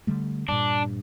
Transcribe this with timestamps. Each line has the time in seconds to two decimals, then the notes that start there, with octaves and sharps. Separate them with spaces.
0.07 D3 G3 A3
0.49 G2 A#2 D4